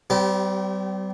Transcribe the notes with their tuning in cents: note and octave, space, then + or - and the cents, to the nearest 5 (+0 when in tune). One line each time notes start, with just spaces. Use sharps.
G3 -35 C4 -45 G4 -5